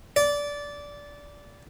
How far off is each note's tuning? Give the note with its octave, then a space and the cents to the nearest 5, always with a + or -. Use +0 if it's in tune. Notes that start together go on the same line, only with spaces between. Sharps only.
D5 -15